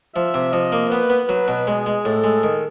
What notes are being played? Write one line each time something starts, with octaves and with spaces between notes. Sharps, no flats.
F3 E5
C3
F3 D#5
A#3
B3 B4
B3
F#3 B4
B2
G#3 G#4
G#3
A2 A4
G#3
D#3